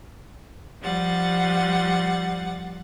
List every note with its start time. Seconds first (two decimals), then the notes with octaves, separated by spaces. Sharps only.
0.81 F3 G3 F#5 A6